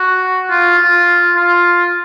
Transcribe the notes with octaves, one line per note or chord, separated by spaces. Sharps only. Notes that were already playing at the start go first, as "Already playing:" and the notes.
Already playing: F#4
F4
F4
F4